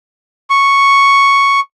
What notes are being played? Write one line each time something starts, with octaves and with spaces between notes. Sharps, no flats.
C#6